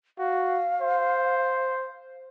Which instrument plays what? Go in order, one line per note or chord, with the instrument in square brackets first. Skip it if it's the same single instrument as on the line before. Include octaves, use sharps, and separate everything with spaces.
[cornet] F#4 [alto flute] F5
[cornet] C5